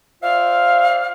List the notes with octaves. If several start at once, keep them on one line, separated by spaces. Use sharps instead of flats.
F4 C5 D5 E5 F5